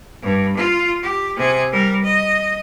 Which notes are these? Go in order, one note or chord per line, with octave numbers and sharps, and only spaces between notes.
G2
F4
G4
C3 G#4
G3 A#4
D#5